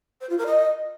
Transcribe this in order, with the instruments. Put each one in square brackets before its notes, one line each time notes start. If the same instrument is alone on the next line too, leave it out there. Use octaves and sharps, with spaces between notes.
[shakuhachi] C5
F4
A#4
D#5